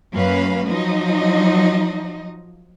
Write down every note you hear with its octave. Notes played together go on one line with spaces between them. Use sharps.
F#2 A#3 C#4 B4 F5
F3 F#3 D#4 D#5